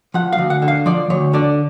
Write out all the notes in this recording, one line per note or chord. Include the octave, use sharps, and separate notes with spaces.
F3 F#5
F5
D2
F#5
D3
F5
F3 D5
D2 C#5
D3 D5